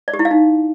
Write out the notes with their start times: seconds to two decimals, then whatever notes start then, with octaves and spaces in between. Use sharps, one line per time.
0.08 D5
0.14 G4
0.19 E4
0.25 F5
0.31 D#4